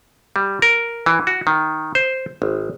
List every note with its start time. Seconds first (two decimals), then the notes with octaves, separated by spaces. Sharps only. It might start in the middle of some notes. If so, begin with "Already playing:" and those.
0.36 G3
0.62 A#4
1.06 E3
1.27 F#4
1.47 D#3
1.95 C5
2.42 G#1